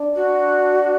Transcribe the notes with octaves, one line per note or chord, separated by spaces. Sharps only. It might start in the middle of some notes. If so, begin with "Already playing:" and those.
Already playing: D4
F#4